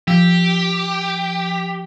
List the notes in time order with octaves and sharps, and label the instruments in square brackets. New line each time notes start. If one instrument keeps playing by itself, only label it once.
[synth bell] F3 E6 [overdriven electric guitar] G4